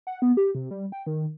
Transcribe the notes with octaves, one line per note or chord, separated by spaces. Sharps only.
F#5
B3
G4
C3
G3
G5
D#3